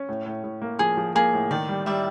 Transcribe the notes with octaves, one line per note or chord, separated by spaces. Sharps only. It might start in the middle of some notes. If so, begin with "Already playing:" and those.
Already playing: C#4
A2
A2
A2
A#3
F3 G#4
F3
A#3 G#4
A2
D#3 D5
G3
G3 D5 E5